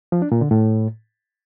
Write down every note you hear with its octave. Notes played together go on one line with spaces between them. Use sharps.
F3
D4
A#2
D3
A2